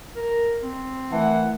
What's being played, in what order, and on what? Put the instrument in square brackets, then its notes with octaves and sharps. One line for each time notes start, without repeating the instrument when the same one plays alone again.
[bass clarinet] A#4
C4
[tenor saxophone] E3 [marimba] A3 A#4 [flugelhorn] F#5